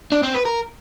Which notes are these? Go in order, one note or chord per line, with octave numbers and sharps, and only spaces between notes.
D4
C4
B4
A#4